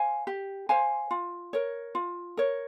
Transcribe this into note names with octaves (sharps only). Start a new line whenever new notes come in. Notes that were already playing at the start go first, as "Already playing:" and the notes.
Already playing: C5 F5 G#5
G4
C5 F5 G#5
F4
A#4 C#5
F4
A#4 C#5